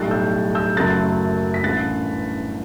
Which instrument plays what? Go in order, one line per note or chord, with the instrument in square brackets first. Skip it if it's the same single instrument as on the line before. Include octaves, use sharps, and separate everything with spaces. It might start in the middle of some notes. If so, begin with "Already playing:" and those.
Already playing: [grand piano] B1 A2 G3 F#6 A6
E6 G6
E6 G6
F#1 F#2 F#3 A3 F#6 A6
B6
A1 G2 E3 A3 F#6 A6